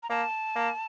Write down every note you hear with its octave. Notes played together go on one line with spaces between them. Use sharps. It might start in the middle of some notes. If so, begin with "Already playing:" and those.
A#5
A#3 A5
A#3